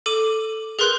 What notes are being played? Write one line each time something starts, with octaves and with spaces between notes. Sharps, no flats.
A4 D6 D#7
G#4 A#4 B4 C6 F#6 G6